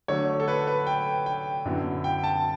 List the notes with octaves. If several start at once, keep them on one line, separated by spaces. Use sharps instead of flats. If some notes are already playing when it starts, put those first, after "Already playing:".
D3 F#3 A3 C#5
A4
B4
B4
G5
G5
F#2 D3 F#3 B3 E4
G5
A5